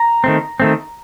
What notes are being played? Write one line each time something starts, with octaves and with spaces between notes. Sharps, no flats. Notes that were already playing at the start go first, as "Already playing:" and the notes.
Already playing: A#5
D#3 A3 C4
D#3 A3 C4